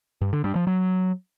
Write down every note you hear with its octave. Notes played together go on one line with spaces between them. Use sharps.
G2
D3
G2
F3
F#3